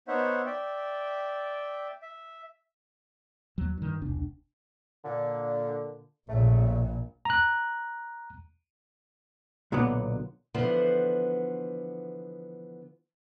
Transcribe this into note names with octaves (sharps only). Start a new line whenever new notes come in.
B3 D#4 C5 C#5 E5 F#5
D5 E5 G5
E5
D#2 F#3
G2 D#3
E1 C2 D4
A#2 D3
A#1 A#2 C#3 A3
A#5 F#6
B1 A#2 D3 F#3 B3
D3 E3 F3 B3 C5 F#5